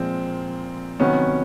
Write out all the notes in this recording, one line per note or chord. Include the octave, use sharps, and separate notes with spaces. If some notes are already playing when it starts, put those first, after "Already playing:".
Already playing: A#2 F3 G#3 C4
C3 D#3 F#3 B3 C#4